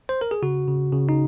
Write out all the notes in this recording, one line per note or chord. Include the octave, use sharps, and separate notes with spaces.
C5
A#4
G#4
C#3 F#4
C#3
C#3
D#4